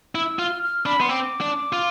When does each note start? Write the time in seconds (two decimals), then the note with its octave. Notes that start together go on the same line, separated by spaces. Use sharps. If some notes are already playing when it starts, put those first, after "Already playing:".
0.14 E4 E6
0.39 F4 F6
0.63 F6
0.85 D4 B5
1.00 B3 C6
1.09 C4 D6
1.41 D4
1.73 F4